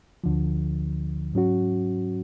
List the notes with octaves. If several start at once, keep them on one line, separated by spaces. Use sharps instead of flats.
D2 D3 F3
G#2 F#3 C#4 F#4